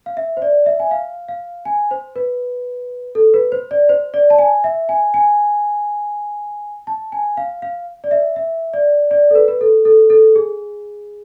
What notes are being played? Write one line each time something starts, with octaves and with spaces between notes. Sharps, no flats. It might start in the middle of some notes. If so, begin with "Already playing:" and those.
F5
E5
C5
D5
E5
G#5
F5
F5
G#5
C5
B4
A4
B4
C5
D5
C5
D5
A5
G#5
E5
G#5
G#5
A5
G#5
F5
F5
D5
E5
E5
D5
D5
A4
B4
B4
A4
A4
A4
G#4